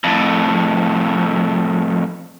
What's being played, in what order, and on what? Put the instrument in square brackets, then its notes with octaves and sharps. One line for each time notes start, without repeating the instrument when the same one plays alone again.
[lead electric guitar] F2 A2